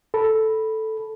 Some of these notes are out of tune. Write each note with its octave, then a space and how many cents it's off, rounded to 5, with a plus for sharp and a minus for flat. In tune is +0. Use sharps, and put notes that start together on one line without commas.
A4 +0 B5 -5